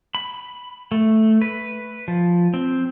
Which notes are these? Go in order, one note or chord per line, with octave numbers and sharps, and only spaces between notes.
B5
A3
B4
F3
C4